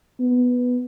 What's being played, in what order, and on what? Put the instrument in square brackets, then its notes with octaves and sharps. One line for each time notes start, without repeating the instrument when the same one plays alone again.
[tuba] B3